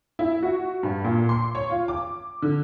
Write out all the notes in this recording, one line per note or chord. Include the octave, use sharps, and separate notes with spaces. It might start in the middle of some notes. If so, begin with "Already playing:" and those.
E4
F#4
G2
A#2
C6
C#5
F4
D6
D3